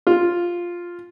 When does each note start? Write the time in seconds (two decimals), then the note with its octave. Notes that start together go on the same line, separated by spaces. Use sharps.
0.07 F4